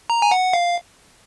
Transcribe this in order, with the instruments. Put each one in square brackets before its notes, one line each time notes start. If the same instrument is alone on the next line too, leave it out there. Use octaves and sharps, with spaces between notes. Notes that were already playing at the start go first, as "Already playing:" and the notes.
[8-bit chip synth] A#5
G#5
F#5
F5